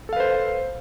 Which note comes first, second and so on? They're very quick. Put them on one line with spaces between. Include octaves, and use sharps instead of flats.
A4 F5 B4 C5